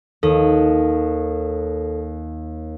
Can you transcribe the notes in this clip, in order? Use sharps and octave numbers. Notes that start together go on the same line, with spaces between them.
D#2 A4